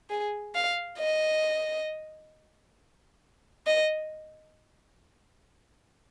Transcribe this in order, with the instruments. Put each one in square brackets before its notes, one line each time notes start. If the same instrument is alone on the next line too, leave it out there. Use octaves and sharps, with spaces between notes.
[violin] G#4
F5
D#5
D#5